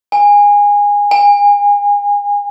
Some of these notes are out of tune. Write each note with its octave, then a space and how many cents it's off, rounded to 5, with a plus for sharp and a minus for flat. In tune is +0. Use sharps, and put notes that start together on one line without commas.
G#5 -20
G#5 -30